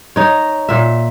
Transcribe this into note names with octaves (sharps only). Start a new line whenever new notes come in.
D#4 C#5
A#2 E5